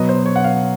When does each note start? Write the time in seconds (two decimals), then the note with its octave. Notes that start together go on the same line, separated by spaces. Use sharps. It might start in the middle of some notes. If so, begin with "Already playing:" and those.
Already playing: B2 F#3 B3 D#5
0.09 C5
0.26 C#5
0.36 F#5
0.44 F5